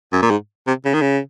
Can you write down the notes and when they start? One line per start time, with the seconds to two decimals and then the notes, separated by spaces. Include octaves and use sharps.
0.12 F#2
0.22 A#2
0.31 G#2
0.67 C3
0.85 C#3
0.94 D#3
1.01 C#3